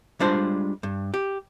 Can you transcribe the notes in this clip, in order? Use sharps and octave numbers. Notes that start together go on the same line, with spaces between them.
G3 G#3 D4 F4 C5
G2
G4